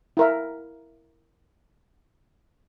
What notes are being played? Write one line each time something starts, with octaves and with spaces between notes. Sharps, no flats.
E4 A#4 E5